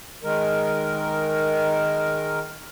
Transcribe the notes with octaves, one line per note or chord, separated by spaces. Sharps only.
D#3 G#3 A#4